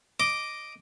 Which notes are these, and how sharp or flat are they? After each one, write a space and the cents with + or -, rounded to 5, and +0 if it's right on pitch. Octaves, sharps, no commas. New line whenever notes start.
D#5 +0 D6 +0